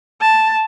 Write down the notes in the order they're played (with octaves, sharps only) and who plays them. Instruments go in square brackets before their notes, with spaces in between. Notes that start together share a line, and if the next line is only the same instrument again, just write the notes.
[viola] A5